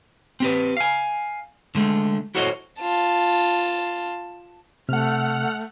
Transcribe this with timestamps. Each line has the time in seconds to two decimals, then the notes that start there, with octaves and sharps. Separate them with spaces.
0.40 C4 G4 B4
0.77 F5 G#5
1.75 D3 G#3 A3
2.35 E4 F#4 A4 C5 C#5 D#5
2.80 F4 A5
4.89 C3 A3 F#5 F6